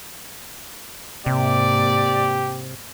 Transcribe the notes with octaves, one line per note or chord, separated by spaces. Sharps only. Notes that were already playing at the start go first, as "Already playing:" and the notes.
G#2 C3 A#3 G4 D5